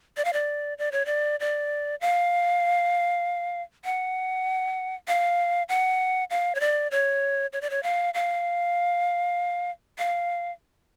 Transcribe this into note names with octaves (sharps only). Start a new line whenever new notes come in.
D5
F5
D5
D5
C#5
D5
D5
F5
F#5
F5
F#5
F5
C#5
D5
C#5
C#5
D5
C#5
F5
F5
F5